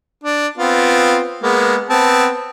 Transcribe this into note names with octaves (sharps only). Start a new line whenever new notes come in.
D4
B3 C4 F4
G#3 A#3 B3
B3 C4 A5